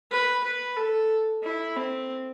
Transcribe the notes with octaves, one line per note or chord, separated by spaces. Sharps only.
B4
B4
A4
E4
C4